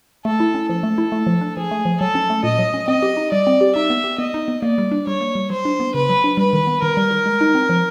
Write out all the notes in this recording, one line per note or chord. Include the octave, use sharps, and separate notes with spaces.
A3 A4
E4
C#4
F3 A4
A3
E4
A3
F3
D4
F3 G#4
A3
F3
F#3 A4
C#4
A3
A#2 D#5
F#3
C#4
C4 D#5
G4
D#4
G3 D5
C4
G4
D#4 E5
B3
G4
B3 D#5
D#4
B3
A#3 D5
G3
D4
G3 C#5
A#3
G3
F#3 C5
D4
B3
C#3 B4
F#3
D4
G3 B4
D#3
B3
D#3 A#4
G3
D#3
G#3
D#4
C4
F3